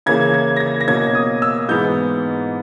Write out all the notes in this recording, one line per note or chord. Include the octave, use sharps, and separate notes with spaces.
C#3 E3 A#3 C#4 G#6
G#6
A#6
G#6
A#6
B2 A#3 C#4 G#6
D#6
E6
G#2 E3 G#3 B3 G6